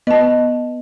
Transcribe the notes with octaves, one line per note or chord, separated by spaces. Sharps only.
B3 D#5 A5